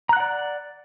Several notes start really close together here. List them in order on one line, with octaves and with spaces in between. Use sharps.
A#5 F#6 F#5 D5